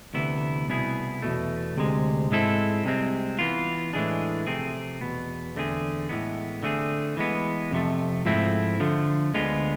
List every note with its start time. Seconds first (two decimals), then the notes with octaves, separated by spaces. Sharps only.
0.14 D2 C3 E3 B3 E4
0.68 C2 B2 B3 E4 G#4
1.22 E2 B2 A3
1.76 D2 C3 G#3
2.30 G#2 G#3 C4 E4 A4
2.84 C2 C3 G#3 C4
3.39 E3 B3 F4
3.93 A2 E3 G#3 D4 G#4
4.47 C3 F3 A3 C4 G#4
5.01 E2 B2 B3
5.55 E2 D3 A3 C4 G#4
6.09 A2 E3 G#3 B3
6.63 D3 A3 C4 G#4
7.17 E3 G#3 B3
7.71 F2 C3 F3 A3
8.25 G#2 F3 A3 C4 E4
8.80 D3 F3 A3
9.34 D2 D3 G#3 B3 F4